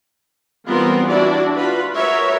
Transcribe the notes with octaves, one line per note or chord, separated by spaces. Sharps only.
E3 G3 B3 C4 F4 A#4
D4 E4 F#4 G4 D5
F4 F#4 B4
F#4 A#4 B4 C#5 E5